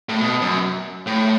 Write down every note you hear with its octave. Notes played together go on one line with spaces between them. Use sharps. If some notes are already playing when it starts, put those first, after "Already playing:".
A2
B2
F#2
A2